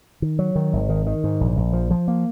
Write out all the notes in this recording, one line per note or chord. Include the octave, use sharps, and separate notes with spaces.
D#3
F#3
D#3
G#1
D#3
D#3
G#2
A#1
A#1
F3
F3
A#3